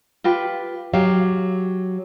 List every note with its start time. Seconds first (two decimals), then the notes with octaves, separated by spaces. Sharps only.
0.24 F4 G4 B4
0.93 F#3 G4 F5